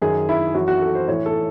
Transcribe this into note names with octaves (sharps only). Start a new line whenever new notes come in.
F#2 D#3 G#4
E4
F#2 E3 F#4
F#4
A4
C5
A2 E3 C#5
A4